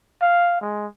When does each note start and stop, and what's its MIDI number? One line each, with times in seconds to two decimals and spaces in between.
0.21 0.58 77
0.61 0.86 56